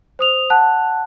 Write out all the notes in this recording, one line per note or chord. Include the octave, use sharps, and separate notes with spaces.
C5 D#6 F7
F#5 A5 F#6